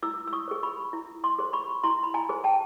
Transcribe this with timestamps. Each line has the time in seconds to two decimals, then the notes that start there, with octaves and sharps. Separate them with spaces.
0.03 E4 D6 E6
0.27 E6
0.33 C#6 D#6
0.48 G#4 C5
0.63 B5 C#6
0.93 E4
1.24 C6 D6
1.39 G#4 C5
1.53 B5 C#6
1.83 E4 A#5 C6
2.03 B5
2.14 G#5 A#5
2.29 G#4 C5
2.44 G5 A5